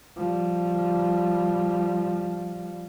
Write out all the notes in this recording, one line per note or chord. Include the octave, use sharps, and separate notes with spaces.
F3 G3